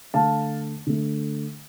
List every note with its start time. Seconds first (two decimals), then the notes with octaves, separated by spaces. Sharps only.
0.14 D3 A3 F5 A5
0.87 D3 A3